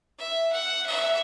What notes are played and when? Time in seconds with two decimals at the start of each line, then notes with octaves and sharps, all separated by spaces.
0.18 E5
0.52 F#5
0.86 E5